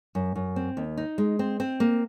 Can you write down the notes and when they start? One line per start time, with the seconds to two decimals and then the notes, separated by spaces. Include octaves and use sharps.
0.15 F#2
0.35 F#2
0.56 C4
0.77 D#2
0.97 D#4
1.18 G#3
1.39 C4
1.60 C4
1.80 A#3